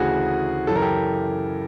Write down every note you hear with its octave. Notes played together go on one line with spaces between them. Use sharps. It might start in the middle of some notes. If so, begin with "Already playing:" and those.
Already playing: D2 C#3 E3 F#4 G#4
F#2 C#3 E3 A4
A#4
G4 A4